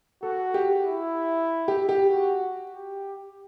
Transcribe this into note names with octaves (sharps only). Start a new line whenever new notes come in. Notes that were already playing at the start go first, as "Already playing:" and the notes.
F#4 A4
G4
E4
G4
G4
F#4
G4